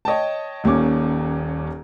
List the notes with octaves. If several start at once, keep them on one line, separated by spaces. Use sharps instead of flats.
C#5 D#5 G5 A5
D#1 D#2 A#3 C#4 D6